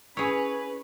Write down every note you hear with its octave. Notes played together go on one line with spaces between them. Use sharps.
C#4 E4 G#4 B4 C#5